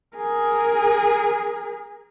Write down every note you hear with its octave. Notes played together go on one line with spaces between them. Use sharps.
G#4 A#4